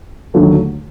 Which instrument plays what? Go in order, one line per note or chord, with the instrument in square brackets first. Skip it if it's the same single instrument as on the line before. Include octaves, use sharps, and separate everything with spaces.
[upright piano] D#2 D3 F#3 A3